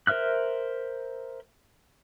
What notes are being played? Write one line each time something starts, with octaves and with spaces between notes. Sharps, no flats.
A#4 C5 E5 F6 F#6